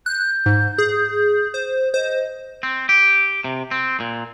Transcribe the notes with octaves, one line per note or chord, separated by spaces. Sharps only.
F#6 G6
G#2
G#4
C5
C5 D#5
C4
G4
C3
C4
A#2